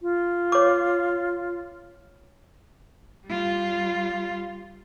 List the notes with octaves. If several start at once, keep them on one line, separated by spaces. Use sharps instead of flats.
F4
C#5 D6
G3 F4